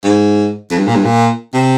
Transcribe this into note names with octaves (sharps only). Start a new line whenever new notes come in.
G#2
F2
G2
A#2
G2
A#2
C3